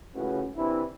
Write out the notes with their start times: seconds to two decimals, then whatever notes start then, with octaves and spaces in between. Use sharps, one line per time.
0.15 C#2 A2 C#3 C#4 F#4 B4
0.56 C3 E3 D4 E4